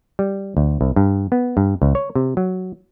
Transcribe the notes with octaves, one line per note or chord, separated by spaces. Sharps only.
G3
D2
C2
G2
B3
G2
C#2
C#5
C3
F#3